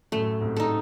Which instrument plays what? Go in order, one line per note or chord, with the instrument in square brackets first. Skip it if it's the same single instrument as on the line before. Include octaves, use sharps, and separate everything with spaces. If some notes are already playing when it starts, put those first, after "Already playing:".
[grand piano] F#2 A2 [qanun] A3
[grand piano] G#2 C3
[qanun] D#4 A4